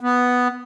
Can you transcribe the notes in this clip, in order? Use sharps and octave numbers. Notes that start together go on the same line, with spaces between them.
B3